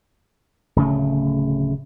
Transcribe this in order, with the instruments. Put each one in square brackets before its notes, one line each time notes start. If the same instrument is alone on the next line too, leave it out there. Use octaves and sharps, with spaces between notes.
[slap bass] D1 C#3 A3